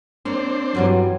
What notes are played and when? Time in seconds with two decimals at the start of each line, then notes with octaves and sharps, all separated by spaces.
0.25 A#3 C4 D4 C5 C#5
0.75 G2 E3 F#3 G3